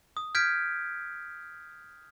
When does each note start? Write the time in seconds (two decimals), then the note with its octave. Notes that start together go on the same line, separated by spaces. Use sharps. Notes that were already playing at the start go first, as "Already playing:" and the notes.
0.17 D#6
0.35 F6 G6 G#6 B6 D7